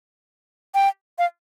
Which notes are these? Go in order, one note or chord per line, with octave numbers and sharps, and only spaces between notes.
G5
F5